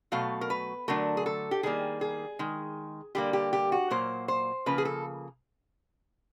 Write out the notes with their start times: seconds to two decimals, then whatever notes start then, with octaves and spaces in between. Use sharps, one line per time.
0.12 B2 F#3 A3 F5
0.41 A#4
0.50 B4
0.88 D3 F#3 A3 A#4
1.17 G#4
1.26 A4
1.51 G4
1.63 D#3 G3 A#3 G#4
2.01 G#4
2.39 D#3 G#3
3.15 D3 G3 A#3 G4
3.33 G4
3.53 G4
3.72 F#4
3.91 A#2 F#3 A#3 C5
4.28 C5
4.66 C#3 F3 A#3 B4
4.78 G#4
4.85 A4